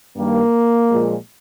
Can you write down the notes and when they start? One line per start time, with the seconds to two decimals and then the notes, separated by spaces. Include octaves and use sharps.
0.17 G2 D#3 G3 A#3
0.91 A#2 F3 G#3